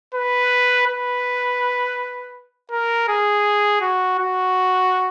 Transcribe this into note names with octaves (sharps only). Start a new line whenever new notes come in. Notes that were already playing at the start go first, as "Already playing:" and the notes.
B4
B4
A#4
G#4
F#4
F#4